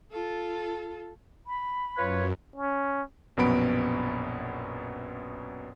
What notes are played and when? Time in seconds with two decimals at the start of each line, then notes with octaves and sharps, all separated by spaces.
0.12 F4 A4
1.46 B5
1.97 F#2 F4 B4 C#5
2.56 C#4
3.37 A#1 F#2 B2 B3 B5 D7